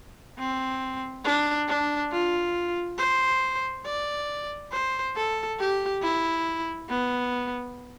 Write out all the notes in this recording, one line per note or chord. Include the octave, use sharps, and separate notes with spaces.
C4
D4
D4
F4
C5
D5
C5
A4
G4
E4
B3